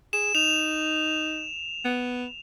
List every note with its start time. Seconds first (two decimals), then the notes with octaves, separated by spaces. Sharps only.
0.13 G#4 E7
0.35 D#4 F7
1.85 B3